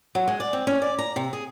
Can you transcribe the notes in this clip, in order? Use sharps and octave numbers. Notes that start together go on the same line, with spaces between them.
F#3
G#3
D5
C4
C#4
D5
A#5
C3
G#4